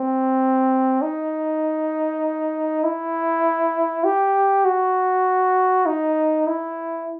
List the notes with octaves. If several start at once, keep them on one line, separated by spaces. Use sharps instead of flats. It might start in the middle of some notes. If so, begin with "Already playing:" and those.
Already playing: C4
D#4
E4
G4
F#4
D#4
E4